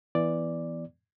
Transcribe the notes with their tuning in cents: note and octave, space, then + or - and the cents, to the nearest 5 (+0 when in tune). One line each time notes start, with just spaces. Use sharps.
E3 +0 B3 +0 D5 +0